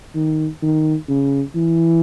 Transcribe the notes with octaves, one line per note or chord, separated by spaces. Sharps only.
D#3
D#3
C#3
E3